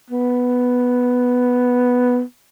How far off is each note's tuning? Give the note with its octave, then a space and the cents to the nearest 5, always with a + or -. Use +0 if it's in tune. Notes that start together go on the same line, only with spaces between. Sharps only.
B3 +0